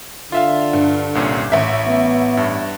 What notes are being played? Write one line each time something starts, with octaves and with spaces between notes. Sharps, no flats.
D3 F4 E5 F5
G2
C2 A#2 C#4
A1 E5 B6
B3
G2